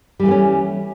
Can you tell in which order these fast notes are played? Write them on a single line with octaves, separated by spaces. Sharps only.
G3 E3 A3 B3 C#4